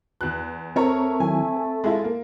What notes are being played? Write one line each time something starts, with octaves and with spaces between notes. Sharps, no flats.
E2 F#6
A3 C4 A#4 C#5 A#5
D#3 F#3 E4 G#5
A4
G#3 E4 F4
A#3